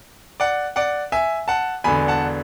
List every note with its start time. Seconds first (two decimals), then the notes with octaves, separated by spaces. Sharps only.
0.40 D5 F#5
0.76 D5 F#5
1.12 E5 G#5
1.48 F#5 A5
1.84 E1 E2 D3 G#5 B5
2.08 F#5 A5